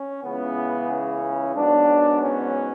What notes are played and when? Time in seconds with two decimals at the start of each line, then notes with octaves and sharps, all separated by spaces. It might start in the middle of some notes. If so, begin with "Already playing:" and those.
Already playing: C#4
0.24 C#2 C#3 E3 B3
0.90 C#4
1.55 G#2 F#3 B3 D4
2.22 C#4